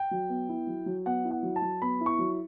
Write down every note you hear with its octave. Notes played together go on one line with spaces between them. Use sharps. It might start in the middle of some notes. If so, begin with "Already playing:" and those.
Already playing: G5
F#3
B3
E4
F#3
F#3
B3 F#5
E4
F#5
F#3
A5
F#3
B3 B5
E4
C#6
F#3